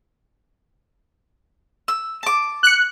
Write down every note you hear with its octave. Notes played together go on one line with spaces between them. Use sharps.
E6
A5 D6
F#6 C#7